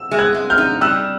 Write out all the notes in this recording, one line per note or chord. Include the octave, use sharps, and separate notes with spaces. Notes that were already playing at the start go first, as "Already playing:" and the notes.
Already playing: E6
G#3
F#6 G#6
G#3
F6 G6
D#4
G3 E6 F#6